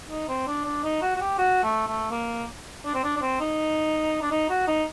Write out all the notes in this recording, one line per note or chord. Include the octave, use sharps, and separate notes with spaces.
D#4
C4
D4
D4
D#4
F#4
F#4
G4
F#4
A3
A3
A#3
D4
C4
D4
D4
C4
D#4
D4
D#4
F#4
D#4